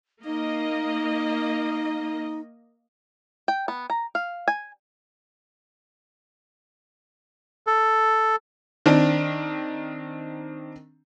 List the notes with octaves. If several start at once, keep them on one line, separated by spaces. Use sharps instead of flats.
A#3 D#4 D#5
G5
B3
A#5
F5
G#5
A4
D#3 C4 D4